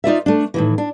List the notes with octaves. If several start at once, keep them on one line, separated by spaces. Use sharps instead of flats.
D#4 F4 D5 E5
A3 D4
A2 D#3 E3
D4